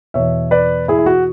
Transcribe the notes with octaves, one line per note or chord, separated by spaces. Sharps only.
E2 B2 C#5 E5
B4 D5
E4 G#4
E4
F#4